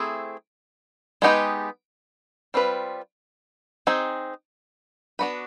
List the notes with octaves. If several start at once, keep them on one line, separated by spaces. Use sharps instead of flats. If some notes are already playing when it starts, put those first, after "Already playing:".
Already playing: A3 C4 E4 G#4
G#3 B3 D#4 G4 B4
G3 C4 F4 G#4 B4
C4 D#4 G#4
B3 D4 F#4 B4